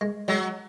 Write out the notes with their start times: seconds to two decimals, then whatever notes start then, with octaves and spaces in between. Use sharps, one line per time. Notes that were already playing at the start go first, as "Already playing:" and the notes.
0.01 G#3
0.28 F#3 G#3